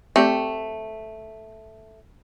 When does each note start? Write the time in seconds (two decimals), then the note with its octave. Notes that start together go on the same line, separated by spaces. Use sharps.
0.16 A3 C4 G4 D5